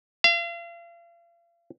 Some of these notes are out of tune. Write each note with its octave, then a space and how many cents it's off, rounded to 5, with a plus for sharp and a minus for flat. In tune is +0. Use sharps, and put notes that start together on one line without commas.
F5 -40